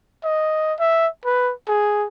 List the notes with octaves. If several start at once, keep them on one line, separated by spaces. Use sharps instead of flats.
D#5
E5
B4
G#4